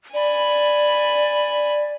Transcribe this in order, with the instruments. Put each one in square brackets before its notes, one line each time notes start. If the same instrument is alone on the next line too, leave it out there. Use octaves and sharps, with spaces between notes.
[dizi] D5 [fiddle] G#5 B5